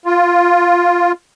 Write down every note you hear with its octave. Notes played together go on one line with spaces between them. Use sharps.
F4